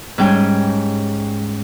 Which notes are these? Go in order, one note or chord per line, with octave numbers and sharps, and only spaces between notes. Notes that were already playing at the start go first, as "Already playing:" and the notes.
G#2 G3 C#4 G5 G#5